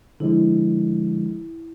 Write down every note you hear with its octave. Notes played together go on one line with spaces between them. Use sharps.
D3 F3 G#3 E4